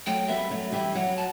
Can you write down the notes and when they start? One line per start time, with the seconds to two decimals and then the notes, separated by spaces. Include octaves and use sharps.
0.06 F#3 A3 G5
0.28 G3 B3 E5
0.50 F#3 A3
0.72 E3 G3 E5
0.95 F#3 F#5
1.17 A5